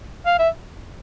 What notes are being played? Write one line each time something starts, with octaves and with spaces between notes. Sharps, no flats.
F5
E5